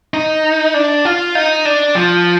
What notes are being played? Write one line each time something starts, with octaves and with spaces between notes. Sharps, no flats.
D#4
D4
F4
D#4
D4
F3